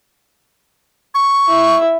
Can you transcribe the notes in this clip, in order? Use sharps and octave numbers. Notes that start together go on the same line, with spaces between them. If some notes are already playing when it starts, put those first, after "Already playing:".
C#6
E4 E5